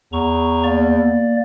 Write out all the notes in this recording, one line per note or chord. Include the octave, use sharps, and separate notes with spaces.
E2 A#5 C#6
A#3 D5